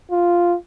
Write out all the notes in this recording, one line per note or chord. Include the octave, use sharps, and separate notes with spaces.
F4